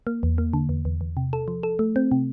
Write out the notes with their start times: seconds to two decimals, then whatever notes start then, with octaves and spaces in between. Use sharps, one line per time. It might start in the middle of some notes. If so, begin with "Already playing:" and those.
0.07 A#3
0.23 E2
0.38 A#3
0.53 D3
0.69 E2
0.85 E2
1.01 E2
1.17 C3
1.33 A4
1.48 F3
1.63 A4
1.79 A3
1.96 C4
2.12 C3